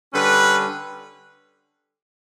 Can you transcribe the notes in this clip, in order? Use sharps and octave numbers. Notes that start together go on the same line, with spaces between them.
D3 G3 C#4 B4